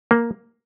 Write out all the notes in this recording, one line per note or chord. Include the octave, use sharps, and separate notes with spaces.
A#3